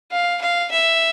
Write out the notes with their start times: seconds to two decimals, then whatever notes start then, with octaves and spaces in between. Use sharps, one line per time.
0.12 F5
0.41 F5
0.71 E5